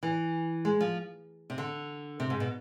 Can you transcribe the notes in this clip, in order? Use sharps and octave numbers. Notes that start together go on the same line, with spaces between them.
E3
G#3
F3
C3
D3
C3
G#2
B2